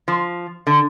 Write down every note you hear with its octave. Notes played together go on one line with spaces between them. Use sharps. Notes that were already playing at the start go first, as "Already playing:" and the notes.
F3
D3